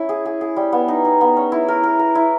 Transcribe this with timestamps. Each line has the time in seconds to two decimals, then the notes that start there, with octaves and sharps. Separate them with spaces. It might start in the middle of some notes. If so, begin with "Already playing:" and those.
Already playing: C#4 E4
0.09 G#4
0.25 G#4
0.41 G#4
0.56 G3
0.72 B3
0.88 D#4
1.05 D#4
1.21 B3
1.37 C#4
1.52 E4
1.68 A#4
1.84 A#4
1.99 A#4
2.15 E4